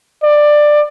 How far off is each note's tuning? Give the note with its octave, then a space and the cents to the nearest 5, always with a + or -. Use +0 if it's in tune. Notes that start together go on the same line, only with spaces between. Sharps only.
D5 +15